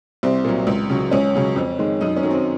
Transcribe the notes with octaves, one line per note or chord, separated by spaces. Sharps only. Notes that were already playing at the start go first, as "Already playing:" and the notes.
C2 C4
A#2 F#3
C#2
C#3 F#3
C#2 C#4
C#3 F#3
F2
D#3 G#3
F#2 D#4
C#4
D#3 F#3
C4